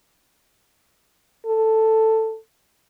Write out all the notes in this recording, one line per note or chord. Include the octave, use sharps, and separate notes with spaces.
A4